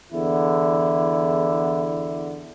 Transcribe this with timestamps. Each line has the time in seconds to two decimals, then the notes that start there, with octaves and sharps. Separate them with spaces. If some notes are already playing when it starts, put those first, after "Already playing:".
0.12 E2 D3 E4